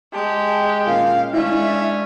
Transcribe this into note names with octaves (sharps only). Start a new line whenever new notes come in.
G#3 G4 A5
A#2 A#3 C#4 F5
G#3 C#4 D4 E4 E5